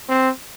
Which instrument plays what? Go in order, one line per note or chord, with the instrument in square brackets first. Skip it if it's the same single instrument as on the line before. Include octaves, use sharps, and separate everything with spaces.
[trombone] C4